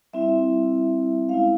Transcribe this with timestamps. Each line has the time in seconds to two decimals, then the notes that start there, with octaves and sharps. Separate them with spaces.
0.13 G3 C4 E4 E5
1.29 G#3 C#4 E4 F5